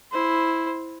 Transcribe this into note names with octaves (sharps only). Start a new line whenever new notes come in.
E4 C5